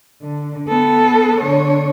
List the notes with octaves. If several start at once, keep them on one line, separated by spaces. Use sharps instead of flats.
D3
B3 A4
D3 C#5